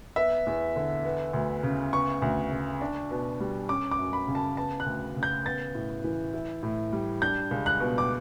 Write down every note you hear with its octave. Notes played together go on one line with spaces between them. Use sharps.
B3 E5
E2
D3
B3
D2
C#3
B3 C#6
D2
C#3
D4
B2
G3
C#4 D6
D6
F#2
B5
C#3
A5
B3 A5
F#6
D2
C#3
G6
B3 A6
A2
E3
E4
A2
G3
D4 G6
C#2
F#6
B2
D6